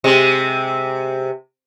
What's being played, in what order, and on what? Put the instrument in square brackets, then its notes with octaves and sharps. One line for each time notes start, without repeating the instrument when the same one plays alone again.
[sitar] C3 G#3